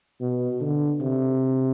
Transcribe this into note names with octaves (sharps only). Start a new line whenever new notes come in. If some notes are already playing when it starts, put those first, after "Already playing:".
B2
D3
C3